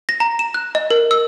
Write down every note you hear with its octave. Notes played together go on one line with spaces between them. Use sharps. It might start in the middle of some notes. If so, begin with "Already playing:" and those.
A#6
A#5
E7
F#6
D#5
A#4
E6